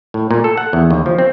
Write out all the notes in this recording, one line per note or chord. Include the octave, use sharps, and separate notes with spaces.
A2
A#2
A4
F#5
E2
D#2
F3
C4